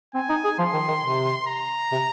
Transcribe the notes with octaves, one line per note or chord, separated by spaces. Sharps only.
C4 G#5
D#4
G#4
F3 C6
D#3
D#3
C3
A#5
C3